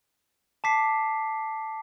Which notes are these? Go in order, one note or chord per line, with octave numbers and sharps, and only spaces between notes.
A5 D6 B6 C7